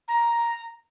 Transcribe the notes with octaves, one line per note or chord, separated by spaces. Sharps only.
A#5